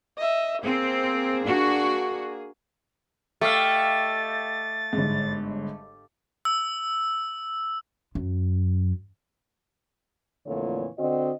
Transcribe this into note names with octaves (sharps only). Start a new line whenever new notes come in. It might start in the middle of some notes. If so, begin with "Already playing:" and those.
D#5 E5
A#3 C4 G#4
D4 F#4
A3 G4 D#5 F5 A6
G1 G#2
E6
F#2
F2 A#2 D3 E3 A3 C#5
D3 C4 F#4 D#5